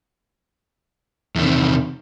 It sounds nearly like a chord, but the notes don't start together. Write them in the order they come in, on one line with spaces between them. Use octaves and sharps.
E2 D#3 C3